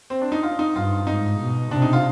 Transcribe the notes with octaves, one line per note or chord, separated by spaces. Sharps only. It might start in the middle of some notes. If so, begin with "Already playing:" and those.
C4
D4
D#4
F4
D#4
G2 F4
G#2 D#4
B2
C3 D4
D#4
F4